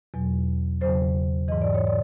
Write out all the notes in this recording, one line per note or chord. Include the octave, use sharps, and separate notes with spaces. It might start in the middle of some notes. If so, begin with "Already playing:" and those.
E2 B2 F#3
E2 C#3 F#3 C5
G#2 E3 D#5
D5
C#5
D5